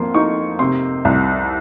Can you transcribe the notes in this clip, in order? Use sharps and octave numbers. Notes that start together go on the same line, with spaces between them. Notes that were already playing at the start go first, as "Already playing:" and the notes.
Already playing: F2 A#3 C6
D#4 C#6
C3 C6
C2